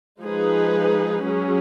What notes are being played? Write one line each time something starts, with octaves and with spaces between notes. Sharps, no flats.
F3 G#3 D#4 G#4 B4
F#3 C#4 G#4